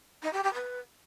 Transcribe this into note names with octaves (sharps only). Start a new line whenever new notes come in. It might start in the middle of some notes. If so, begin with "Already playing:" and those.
D#4
G4
G4
B4